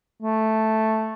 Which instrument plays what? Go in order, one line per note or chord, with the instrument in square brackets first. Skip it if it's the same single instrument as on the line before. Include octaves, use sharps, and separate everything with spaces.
[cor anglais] A3